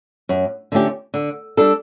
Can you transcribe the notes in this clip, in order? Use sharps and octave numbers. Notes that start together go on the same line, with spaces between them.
F#2
D3 A3 C#4 G4
D3
G3 D4 A4